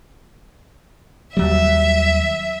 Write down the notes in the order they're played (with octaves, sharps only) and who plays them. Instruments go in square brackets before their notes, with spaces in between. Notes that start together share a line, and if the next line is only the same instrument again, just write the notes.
[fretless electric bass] D#2 F#3 G3 [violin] E5